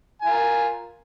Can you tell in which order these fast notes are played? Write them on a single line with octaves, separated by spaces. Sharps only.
G#5 F4 A#4